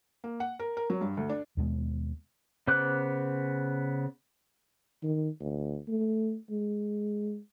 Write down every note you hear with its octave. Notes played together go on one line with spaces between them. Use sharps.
A#3
F#5
A#4
A#4
F#3
G2
D2
D4
D#2 B2 G#3
C#3 B3 C5 D6 F#6
D#3
D2
A3
G#3